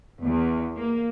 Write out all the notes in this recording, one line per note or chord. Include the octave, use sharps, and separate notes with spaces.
E2
A#3